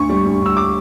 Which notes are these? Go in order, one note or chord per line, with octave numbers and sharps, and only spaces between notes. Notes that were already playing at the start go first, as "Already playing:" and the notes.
Already playing: D2 C#6
G3
D2
D2 E6
D6